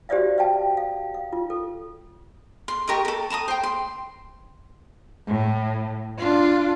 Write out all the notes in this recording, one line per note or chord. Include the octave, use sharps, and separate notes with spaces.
F#4 G4 C5 D5 E5 F5
E5 F5 G5 A5
F5
F5
F4
A4
C6
G4 A#4 D#5 C#6
A4 A#4
A5 A#5 C6 D#6
C5 G5
C6
A2
D4 F4